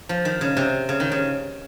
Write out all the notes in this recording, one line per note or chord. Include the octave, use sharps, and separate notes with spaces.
F3
D#3
C#3
C3
C#3
D#3
C#3